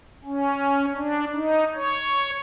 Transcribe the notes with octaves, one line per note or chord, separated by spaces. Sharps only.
C#4
D4
D#4
C#5